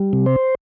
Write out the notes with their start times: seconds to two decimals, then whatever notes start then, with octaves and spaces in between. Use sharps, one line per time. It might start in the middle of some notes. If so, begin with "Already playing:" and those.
Already playing: G3
0.13 C3
0.26 C5